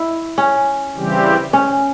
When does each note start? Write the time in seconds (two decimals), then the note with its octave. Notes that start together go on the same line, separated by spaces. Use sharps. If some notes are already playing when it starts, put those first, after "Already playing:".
Already playing: E4
0.38 C#4
0.95 C#3 E3 G3 C4 G4
1.53 C#4